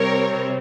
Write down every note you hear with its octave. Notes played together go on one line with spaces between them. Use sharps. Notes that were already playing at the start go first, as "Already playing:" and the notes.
Already playing: C3 G3 C4 A#4 C#5